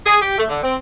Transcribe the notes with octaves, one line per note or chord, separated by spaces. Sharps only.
G#4
G4
A3
D3
C4